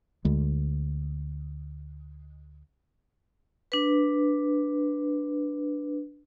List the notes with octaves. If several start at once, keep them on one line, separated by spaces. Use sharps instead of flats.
D2 G#3
D4 B4